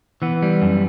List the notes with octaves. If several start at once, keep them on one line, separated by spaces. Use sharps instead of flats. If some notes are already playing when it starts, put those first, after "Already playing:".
E3 B3
G3
F#2